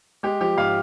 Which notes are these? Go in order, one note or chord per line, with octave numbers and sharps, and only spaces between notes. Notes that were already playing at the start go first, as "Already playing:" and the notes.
G#3 G4
F3 G4
G#2 F5